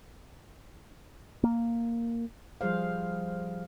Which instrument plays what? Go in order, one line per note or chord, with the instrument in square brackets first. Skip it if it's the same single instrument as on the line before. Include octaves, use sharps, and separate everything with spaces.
[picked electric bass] A#3
[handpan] F3 G3 G#4 C5 F5